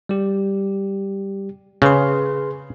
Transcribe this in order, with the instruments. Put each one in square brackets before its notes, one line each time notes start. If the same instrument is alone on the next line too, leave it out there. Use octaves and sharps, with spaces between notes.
[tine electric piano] G3 G4
[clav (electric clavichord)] C#3 [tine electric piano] G#4 B4 C6